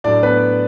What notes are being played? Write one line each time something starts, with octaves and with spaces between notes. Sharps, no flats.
A2 F#3 D4 D5
B3 B4